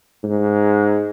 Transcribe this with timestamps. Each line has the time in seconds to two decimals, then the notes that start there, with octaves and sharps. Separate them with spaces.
0.24 G#2